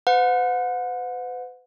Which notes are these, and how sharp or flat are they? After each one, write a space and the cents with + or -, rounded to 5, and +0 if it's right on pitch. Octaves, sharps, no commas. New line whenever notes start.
B4 +45 F#5 -35